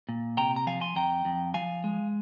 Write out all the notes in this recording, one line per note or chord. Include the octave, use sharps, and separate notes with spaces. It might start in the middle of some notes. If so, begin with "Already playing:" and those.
A#2
C3 G5 A#5
A#5
F3 F5 G#5
G#5 C6
F2 G5 A#5
F2
F3 F5 G#5
G#3